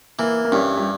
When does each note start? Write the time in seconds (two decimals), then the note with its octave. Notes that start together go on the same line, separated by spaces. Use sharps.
0.19 E3 A#3
0.45 A#3
0.52 G2 C#4
0.77 G3